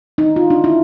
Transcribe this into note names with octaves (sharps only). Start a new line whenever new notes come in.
D#4
F4
D4
E4